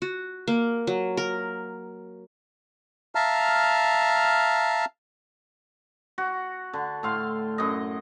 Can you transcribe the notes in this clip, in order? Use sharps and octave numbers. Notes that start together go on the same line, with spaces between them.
F#4
A#3
F#3
A#4
E5 F5 A5 A#5 F6
F#4
D3
A2 F5 C6
F#2 D#5